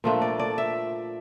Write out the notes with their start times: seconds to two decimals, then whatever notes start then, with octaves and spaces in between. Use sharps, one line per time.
0.04 A#2 F3 A3 D4
0.22 D5
0.39 D5
0.58 E5